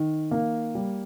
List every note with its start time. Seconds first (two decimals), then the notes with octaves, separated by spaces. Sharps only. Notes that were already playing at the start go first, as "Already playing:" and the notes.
Already playing: D#3
0.31 A#3
0.75 G3